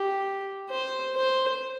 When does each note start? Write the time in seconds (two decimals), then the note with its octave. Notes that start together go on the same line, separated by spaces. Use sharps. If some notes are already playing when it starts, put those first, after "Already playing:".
Already playing: G4
0.70 C5
1.15 C5